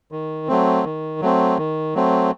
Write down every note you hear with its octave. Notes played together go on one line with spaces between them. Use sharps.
D#3
F#3 A3 C4
D#3
F#3 A3 C4
D#3
F#3 A3 C4